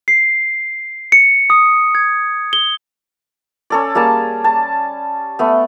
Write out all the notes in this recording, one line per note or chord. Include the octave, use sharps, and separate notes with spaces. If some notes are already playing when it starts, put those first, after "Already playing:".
C7
C#7
D#6
G#6
G7
C#4 A4 D5
G3 A#3 G#4 A5
A5
A3 B3